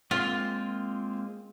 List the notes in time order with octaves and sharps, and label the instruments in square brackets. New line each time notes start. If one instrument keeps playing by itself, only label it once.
[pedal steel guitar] G#3 A#3 C4 [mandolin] F4